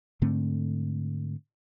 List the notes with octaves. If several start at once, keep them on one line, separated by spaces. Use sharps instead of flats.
G#2 D3 A3 C4